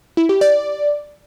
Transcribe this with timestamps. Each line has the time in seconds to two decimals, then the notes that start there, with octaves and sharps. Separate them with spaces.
0.17 E4
0.29 G4
0.41 D5